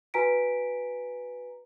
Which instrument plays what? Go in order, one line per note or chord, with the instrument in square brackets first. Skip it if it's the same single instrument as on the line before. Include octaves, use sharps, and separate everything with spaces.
[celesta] F#4 B4 G#5 A#5 B6 D7